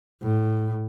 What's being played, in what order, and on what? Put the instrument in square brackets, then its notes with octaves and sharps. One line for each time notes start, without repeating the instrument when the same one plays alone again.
[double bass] A2